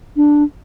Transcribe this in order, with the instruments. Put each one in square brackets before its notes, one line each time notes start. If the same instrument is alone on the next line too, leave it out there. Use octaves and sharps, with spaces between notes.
[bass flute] D4